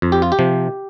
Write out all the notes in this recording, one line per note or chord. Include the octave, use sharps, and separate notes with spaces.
F2
G4
F4
G4
C3 F3